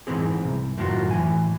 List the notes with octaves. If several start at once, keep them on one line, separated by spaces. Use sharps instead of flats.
G#2 E3 B3 C4 G#4
C2
F#2 A2 D#3 D4 F4 F#4
A2 E3 G#5